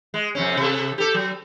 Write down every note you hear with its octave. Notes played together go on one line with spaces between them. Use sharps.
G#3
F2 C3 C#4
C3 A4
G4 A4
F#3